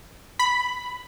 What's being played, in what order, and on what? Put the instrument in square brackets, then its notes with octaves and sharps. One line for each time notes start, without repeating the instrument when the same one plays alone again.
[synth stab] B5